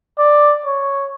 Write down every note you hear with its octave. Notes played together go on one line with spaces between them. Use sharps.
D5
C#5